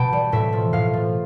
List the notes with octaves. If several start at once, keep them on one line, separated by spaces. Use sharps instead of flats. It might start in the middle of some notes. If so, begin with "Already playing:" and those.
Already playing: B2 G5 A5 B5
G3
A2 E5
F3
A2 F5
F3